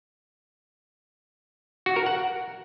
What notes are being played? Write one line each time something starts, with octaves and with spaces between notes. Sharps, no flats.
F#4
A#4
F#5